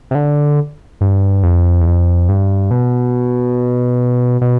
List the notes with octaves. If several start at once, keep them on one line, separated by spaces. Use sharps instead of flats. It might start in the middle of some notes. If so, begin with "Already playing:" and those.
C3
D3
G2
F2
E2
F2
G2
B2
B2